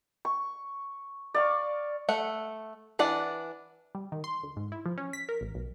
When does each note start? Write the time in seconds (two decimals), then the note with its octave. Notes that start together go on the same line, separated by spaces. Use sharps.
0.25 C#6
1.34 D5 F5 C#6
2.09 A3 F#5
2.99 E3 D4 D5 F#5
3.95 G3
4.12 D#3
4.24 C6
4.43 D2
4.56 G#2
4.72 E4
4.86 F3
4.98 C#4
5.13 B6
5.29 A#4
5.41 A1
5.55 B1